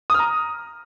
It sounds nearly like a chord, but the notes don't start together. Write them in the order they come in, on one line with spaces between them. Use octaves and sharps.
D#6 F6 A#5